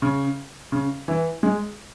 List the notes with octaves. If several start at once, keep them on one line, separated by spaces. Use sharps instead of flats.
C#3
C#3
E3
G#3